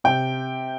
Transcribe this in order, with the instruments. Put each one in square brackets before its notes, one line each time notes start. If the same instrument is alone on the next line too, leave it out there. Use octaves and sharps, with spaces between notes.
[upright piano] C3 G5